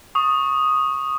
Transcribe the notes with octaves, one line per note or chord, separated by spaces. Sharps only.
C#6 D#6